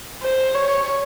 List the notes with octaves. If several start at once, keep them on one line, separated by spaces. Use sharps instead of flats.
C5
C#5